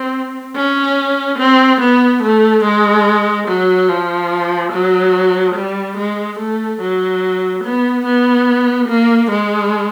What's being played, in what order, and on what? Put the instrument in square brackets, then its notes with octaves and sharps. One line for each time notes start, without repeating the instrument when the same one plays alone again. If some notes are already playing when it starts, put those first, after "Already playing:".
Already playing: [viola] C4
C#4
C4
B3
A3
G#3
F#3
F3
F#3
G3
G#3
A3
F#3
B3
B3
A#3
G#3